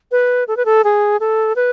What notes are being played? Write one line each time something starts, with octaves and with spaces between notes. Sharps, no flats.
B4
A4
B4
A4
G#4
A4
B4